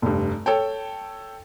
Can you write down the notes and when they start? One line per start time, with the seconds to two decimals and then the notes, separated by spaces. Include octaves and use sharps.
0.02 F1 G2
0.46 A4 C#5 G5